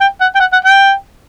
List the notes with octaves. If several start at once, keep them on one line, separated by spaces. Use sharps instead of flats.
G5
F#5
G5
F#5
F#5
G5